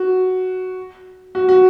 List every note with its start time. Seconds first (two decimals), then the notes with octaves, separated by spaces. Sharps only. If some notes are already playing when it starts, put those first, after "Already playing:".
Already playing: F#4
1.35 F#4
1.49 F#4